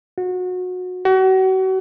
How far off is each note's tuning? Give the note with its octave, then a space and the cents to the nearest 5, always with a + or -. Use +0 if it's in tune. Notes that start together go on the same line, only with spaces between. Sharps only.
F#4 -25
F#4 +35